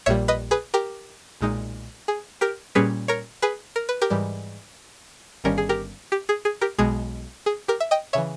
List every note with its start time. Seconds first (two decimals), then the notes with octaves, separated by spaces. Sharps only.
0.06 A#1 A#2 G3 C#5 E5
0.28 B4 D#5
0.51 G#4 B4
0.74 G4 A#4
1.41 B1 A#2 G#3 D#4
2.08 G#4
2.41 G4 A#4
2.75 A#2 G3 C#4 G#4 B4
3.08 A#4 C#5
3.42 G#4 B4
3.76 A#4
3.89 B4
4.01 G4 A#4
4.10 G#2 E3 G3
5.44 G1 G2 D#3 G3 C#4 A#4
5.58 G#4
5.69 G4 A#4
6.12 G4
6.29 G#4
6.45 G#4
6.61 G4 A#4
6.78 B1 B2 G#3 G#4
7.46 G#4
7.68 G4 A#4
7.80 E5
7.91 D#5 G5
8.13 C#3 E3 C#5 E5